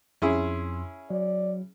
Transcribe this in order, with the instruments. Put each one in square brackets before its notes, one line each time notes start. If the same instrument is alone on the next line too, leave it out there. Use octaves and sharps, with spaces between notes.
[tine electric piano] F2 C6 E6 [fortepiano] C#4 E4 G#4
[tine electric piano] F#3 [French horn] D5